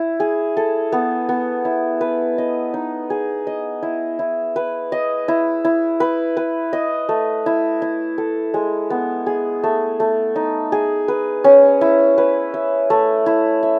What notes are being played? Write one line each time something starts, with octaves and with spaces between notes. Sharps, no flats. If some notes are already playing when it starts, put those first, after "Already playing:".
Already playing: E4
G#4
A4
B3
B3
E4
B4
D#5
D#4
G#4
D#5
E4
E4
B4
D#5
E4
E4
B4
B4
D#5
A3
E4
E4
A4
G#3
B3
G#4
A3
A3
D#4
G#4
B4
C#4
E4
B4
E5
A3
E4
E5